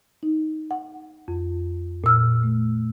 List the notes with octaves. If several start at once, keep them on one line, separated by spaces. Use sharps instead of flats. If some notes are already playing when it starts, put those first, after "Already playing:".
D#4
F#5
F2
A#2 E6 F6
A3